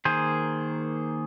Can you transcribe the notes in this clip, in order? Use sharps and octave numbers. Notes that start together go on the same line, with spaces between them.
D#3 A#3 G#4 C5